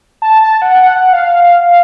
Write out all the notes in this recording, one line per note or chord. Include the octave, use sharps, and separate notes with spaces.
A5
A5
F#5
F#5
F5